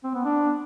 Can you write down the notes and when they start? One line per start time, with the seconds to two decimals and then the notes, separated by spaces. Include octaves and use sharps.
0.04 C4
0.14 B3
0.25 D4